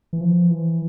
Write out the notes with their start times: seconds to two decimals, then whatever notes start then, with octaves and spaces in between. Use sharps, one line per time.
0.13 E3
0.21 F3
0.50 E3